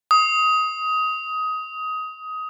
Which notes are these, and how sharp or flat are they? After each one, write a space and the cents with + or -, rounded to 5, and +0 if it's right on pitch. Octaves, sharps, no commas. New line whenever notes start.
D#6 +15